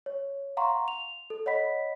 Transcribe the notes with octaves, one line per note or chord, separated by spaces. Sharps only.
C#5
F5 F#5 A#5 C6 C#6
F7
A4
C#5 D#5 F#5 B5 B6